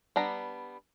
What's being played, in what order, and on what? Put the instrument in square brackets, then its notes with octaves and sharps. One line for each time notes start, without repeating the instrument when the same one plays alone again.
[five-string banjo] G3 B3 D4 A#5